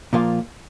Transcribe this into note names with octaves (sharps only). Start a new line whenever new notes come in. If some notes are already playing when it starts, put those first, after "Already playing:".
A#2 F3 A#3 F4